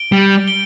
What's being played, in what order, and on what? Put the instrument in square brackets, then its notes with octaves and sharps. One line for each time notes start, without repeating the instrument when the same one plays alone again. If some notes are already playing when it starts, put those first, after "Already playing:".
Already playing: [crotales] D7 G7
[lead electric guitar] G3
[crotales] D7 G7